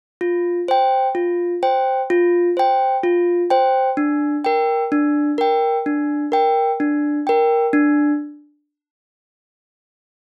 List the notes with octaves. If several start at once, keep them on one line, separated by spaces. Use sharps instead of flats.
F4
C5 G5
F4
C5 G5
F4
C5 G5
F4
C5 G5
D4
A#4 G5
D4
A#4 G5
D4
A#4 G5
D4
A#4 G5
D4